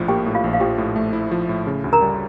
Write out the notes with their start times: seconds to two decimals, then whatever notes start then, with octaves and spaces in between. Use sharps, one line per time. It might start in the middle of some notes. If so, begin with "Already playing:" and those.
Already playing: A#1 A2 F3
0.08 A#3 G4 G5
0.26 A2
0.35 F4 F5
0.44 A#1
0.53 F5
0.60 F3 G4 G5
0.78 A2
0.96 A3
1.13 E4
1.31 F3
1.49 A2
1.67 C#3
1.84 D2
1.93 A#4 A#5
2.02 G3